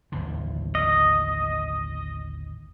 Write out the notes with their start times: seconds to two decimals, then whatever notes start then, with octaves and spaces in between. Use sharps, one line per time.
0.12 A1 D#2 D3
0.75 D#5